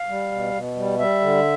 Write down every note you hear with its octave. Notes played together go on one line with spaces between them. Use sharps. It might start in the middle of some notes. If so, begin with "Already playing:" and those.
Already playing: F5
G3
B2
B2
G3
G3 E5
D3